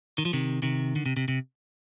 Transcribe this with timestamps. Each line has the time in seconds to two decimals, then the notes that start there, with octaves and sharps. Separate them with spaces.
0.18 D#3
0.25 F3
0.33 C3 D#3
0.62 C3 D#3
0.96 D3
1.06 C3
1.17 C3
1.28 C3